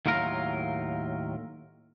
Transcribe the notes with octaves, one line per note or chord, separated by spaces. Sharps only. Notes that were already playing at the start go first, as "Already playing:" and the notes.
D#2 A2 F#3 F4 A#4